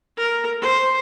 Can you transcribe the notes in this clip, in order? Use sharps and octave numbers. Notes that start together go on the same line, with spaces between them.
A#4
C5